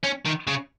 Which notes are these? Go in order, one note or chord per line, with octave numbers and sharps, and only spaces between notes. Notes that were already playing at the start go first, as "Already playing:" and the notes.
C#4
D#3
C#3